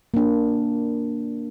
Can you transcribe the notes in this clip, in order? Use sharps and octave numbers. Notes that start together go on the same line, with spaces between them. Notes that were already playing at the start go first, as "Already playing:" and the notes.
A#3 D4